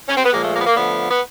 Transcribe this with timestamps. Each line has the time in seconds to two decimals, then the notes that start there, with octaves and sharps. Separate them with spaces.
0.08 C#4
0.17 C4
0.25 B3
0.32 A#2 F3 G#3 A#3
0.43 A3
0.54 A#3
0.61 B3
0.66 A#3
0.76 D3 F3 A3 B3
1.10 B3